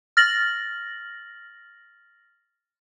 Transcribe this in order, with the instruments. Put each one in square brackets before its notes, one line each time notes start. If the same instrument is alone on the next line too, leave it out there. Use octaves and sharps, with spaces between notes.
[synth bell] F6 A6 A#6 F#7